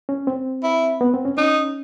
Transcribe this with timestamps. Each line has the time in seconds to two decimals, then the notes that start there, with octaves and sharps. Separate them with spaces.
0.09 C#4
0.27 C4
0.64 E4
1.01 B3
1.14 C4
1.25 C#4
1.38 C#4 D#4